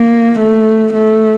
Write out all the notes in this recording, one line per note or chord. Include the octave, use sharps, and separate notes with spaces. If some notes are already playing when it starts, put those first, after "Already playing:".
Already playing: A#3
A3
A3